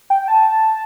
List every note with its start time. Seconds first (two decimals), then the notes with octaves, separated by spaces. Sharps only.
0.10 G5
0.28 A5